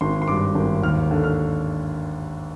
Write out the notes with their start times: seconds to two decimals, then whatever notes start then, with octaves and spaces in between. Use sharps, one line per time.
0.01 G#1 C6
0.22 C6
0.28 G2 D6
0.55 G#1
0.83 D#2 F6
1.11 D3
1.24 F6